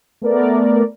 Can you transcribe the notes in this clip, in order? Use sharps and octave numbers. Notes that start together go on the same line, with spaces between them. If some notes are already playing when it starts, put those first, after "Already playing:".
A3 B3 A#4 D5